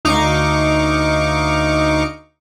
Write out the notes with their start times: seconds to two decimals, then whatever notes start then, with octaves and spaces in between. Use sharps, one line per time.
0.05 D2 D#4 F5 C#6 D6 C#7